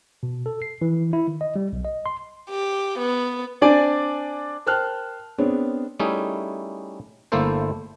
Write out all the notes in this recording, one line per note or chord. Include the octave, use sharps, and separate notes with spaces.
B2
A4
C7
E3
E4
D#3
D#5
G3
B1
D#5
C6
G4
B3
C4 D4 D5 G#5
A#4 C5 G5 A5 F6 F#6
B3 C4 D4 G#4 C#5
G3 A3 C#4 D#4 E4 G#4
G1 A3 A#3 E4 A4 C5